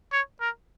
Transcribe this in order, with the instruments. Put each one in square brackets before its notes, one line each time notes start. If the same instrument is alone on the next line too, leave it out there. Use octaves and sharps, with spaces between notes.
[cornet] C#5
A#4